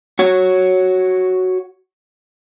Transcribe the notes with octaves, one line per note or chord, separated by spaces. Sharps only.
F#4 C#5